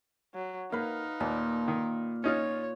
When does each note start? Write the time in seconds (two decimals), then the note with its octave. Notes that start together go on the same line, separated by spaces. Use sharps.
0.35 F#3
0.72 A#3 D#4 B4 F5
1.20 D#2 A#2
1.68 D#3
2.24 C#4 D#4 F4 C#5